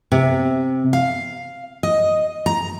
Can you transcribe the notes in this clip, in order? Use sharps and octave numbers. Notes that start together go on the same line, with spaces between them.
C3
F5
D#5
A#5